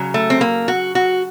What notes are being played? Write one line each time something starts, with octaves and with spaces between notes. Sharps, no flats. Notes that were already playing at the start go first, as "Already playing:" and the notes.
Already playing: C#3 F#3
A3
C4
A#3
F#4
F#4